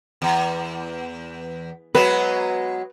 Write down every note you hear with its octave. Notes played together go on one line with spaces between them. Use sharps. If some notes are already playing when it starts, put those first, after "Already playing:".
E2
F#3 G#3 B3 B4